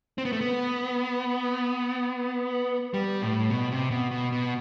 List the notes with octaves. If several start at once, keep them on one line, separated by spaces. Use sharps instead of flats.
C4
B3
A3
B3
G3
A2
B2
C3
B2
B2
B2